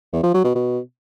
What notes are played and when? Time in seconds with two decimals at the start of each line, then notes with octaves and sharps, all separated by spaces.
0.13 E2
0.23 F3
0.34 F#3
0.44 B2
0.55 B2